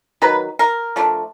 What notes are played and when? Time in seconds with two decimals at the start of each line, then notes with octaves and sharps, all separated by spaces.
0.22 D#3 F#3 B4
0.59 A#4
0.96 F3 A3 D4